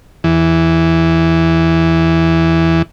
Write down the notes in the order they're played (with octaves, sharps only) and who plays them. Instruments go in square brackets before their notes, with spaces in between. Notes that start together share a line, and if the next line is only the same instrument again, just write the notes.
[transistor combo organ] E2 E3